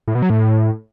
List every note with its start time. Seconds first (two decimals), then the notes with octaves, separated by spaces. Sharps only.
0.08 A2
0.15 B2
0.22 F#3
0.30 A2